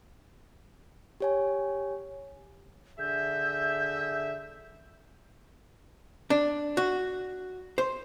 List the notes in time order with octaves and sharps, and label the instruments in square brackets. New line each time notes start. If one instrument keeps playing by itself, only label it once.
[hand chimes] G4 C#5 G#5
[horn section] D3 G#4 E5 [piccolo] G6
[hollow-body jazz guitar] D4
F#4
C5